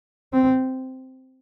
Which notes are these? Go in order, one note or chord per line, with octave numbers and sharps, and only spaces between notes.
C4